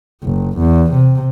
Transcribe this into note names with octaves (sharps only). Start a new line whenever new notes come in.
F#1
E2
C3